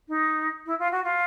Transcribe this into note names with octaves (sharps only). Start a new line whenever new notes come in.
D#4
E4
F4
F#4
F4